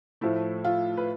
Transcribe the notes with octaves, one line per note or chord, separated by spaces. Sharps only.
A2 F3 A3 E4
F4
B4